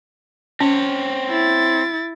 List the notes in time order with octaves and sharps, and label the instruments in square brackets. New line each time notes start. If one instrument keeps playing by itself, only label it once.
[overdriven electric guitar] C4 C#5 [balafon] C#4
[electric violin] E4 A6